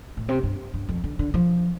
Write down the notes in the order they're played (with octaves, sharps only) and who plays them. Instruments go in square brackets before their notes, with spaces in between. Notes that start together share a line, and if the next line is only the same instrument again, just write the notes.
[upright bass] A2
C3
G2
G2
F2
D3
D3
F3